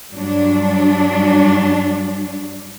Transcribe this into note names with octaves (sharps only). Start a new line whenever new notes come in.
G2 F#3 D4